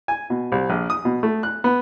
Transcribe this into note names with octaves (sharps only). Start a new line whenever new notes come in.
G#5
B2
C2
A#1
D#6
B2
A3
F#6
B3